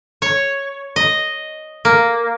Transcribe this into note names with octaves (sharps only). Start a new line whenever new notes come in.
C#5
D#5
A#3